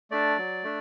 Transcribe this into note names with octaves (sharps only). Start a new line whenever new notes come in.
A3 D4 D5
F#3
A3 D4